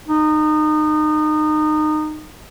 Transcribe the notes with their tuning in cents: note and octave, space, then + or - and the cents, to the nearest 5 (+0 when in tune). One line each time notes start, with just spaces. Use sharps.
D#4 -25